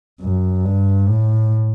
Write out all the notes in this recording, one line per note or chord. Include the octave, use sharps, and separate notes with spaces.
F#2
G2
A2